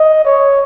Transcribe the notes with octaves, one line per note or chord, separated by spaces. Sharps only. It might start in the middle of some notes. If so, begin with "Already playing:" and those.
Already playing: D#5
C#5